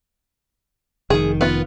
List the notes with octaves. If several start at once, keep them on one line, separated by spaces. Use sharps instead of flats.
F1 D#3 G#4
B3 F4